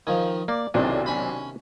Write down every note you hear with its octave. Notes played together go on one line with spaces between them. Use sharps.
D#3 F3 G#5
A#3 D5
B1 A2 C3 D#3 C4 D4 D5
C#4 B5